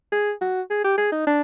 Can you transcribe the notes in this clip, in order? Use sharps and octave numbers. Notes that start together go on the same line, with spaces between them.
G#4
F#4
G#4
G4
G#4
D#4
D4